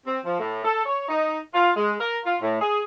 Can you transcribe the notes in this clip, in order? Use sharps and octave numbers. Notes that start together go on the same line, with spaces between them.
C4
F3
A2
A4
C#5
D#4
F4
G#3
A#4
F4
A2
G#4